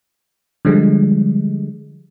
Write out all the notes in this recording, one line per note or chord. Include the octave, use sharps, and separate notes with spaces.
D3 F3 G3 G#3